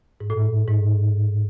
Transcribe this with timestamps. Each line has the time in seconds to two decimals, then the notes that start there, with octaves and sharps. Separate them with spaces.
0.20 G#2
0.30 A2
0.68 G#2